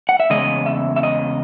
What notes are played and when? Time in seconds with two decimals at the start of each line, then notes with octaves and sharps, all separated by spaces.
0.09 F#5
0.20 E5
0.30 E2 C#3 G#3 D#5
0.66 E5
0.96 E5
1.03 D#5